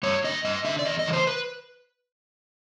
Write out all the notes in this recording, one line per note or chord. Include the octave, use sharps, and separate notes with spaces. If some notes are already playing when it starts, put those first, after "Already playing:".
G2 C#5
D3 D#5
G2 D#5
D3 E5
D5
E2 D#5
D#5
C#3 E3
C5
B4